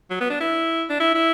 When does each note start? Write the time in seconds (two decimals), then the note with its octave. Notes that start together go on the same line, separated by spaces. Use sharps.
0.10 F#3
0.21 B3
0.30 D4
0.40 E4
0.90 D4
1.00 E4
1.15 E4